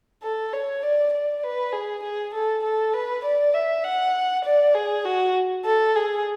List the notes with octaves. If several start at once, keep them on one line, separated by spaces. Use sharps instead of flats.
A4
C#5
D5
D5
B4
G#4
G#4
A4
A4
B4
D5
E5
F#5
D5
G#4
F#4
A4
G#4